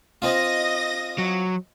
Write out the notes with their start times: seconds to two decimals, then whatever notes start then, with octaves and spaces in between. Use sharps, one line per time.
0.22 C4 F4 D#5 D#6 A#6
1.18 F#3